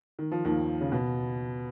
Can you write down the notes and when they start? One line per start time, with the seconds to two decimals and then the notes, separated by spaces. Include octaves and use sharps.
0.19 D#3
0.32 F3
0.45 D#2 D#3
0.81 C#3
0.92 B2